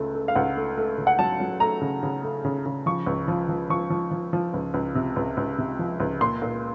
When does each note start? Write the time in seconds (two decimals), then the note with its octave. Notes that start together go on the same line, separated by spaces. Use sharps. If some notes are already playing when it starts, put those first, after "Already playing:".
Already playing: C#2 C#3 A3
0.15 A3
0.28 F5
0.35 C#2 F#5
0.57 A3
0.78 A3
0.98 C#3
1.07 F#5
1.19 F#3 A5
1.40 F#3
1.60 A3 A#5
1.82 C#3
2.03 C#3
2.23 A3
2.45 C#3
2.66 C#3
2.86 F3 C#6
3.07 C#2
3.28 F3
3.49 F3
3.70 F3 C#6
3.90 F3
4.11 F3
4.33 F3
4.54 C#2
4.74 C#2
4.95 C3
5.16 C#2
5.37 C#2
5.58 C3
5.79 F3
6.00 C#2
6.21 A#2 C6
6.42 A#2